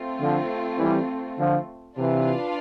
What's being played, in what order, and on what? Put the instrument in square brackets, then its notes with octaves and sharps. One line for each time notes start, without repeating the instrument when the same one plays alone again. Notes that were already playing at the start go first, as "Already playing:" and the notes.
Already playing: [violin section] A3 C4 F4
[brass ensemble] D3 F3
E3 G3
D3 F3
[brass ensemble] C3 E3 [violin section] D4 F4 B4 F5